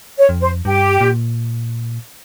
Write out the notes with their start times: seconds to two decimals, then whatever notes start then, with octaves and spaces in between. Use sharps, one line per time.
0.17 C#5
0.29 F2
0.41 C5
0.64 G2 G4
1.01 A#2